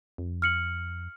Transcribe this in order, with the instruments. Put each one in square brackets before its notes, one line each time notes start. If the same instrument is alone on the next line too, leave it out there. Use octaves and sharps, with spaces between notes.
[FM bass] F2
[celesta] F6 C#7 F#7